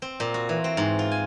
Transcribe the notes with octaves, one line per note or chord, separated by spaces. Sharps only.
C4
A#2
F#4
E3
C4
G#2
F4
G#5